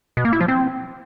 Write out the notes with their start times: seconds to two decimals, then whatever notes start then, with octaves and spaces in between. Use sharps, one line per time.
0.17 B2
0.25 A#3
0.33 E4
0.41 F3
0.48 C4